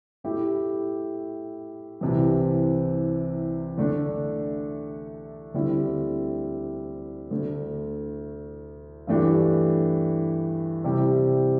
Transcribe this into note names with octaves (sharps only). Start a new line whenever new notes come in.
A2 A3 E4 G4
C2 C3 E3
D3 A3 D4
D2 D3 G3 C4 E4
D2 D3 A3
G2 E3 A3 D4 G4
C3 G3 E4 G4